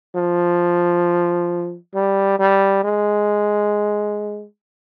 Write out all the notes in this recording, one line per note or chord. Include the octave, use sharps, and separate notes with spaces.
F3
G3
G3
G#3